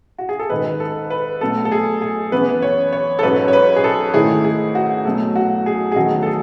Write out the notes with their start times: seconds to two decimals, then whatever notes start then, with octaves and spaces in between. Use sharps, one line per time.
0.19 F#4
0.29 G#4
0.39 A4
0.50 G#2 D#3 G#3 D#4 B4
0.80 A4
1.10 B4
1.41 B2 F#3 A3 A4
1.65 A4
1.72 G#4
2.02 G#4
2.32 F#2 E3 B3 B4
2.62 C#5
2.93 C#5
3.19 A4
3.23 G#2 F#3 C#4 B4
3.48 C#5
3.53 B4
3.76 G#4
3.84 A4
4.14 G#2 D#3 A3 E4 G#4
4.44 G#4
4.75 F#4
5.05 B2 F#3 A3
5.36 F#4
5.66 G#4
5.92 G#4
5.96 E2 D#3 F#3 A3 F#4
6.22 A4
6.26 G#4